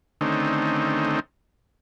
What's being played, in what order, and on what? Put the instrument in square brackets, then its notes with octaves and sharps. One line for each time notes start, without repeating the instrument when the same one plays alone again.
[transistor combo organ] D3 D#3 A3 C4 C#4 D#4